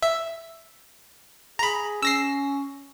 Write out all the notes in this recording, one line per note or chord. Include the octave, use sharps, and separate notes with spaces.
E5
G#4 A#5 B5
C#4 E6 A#6 C7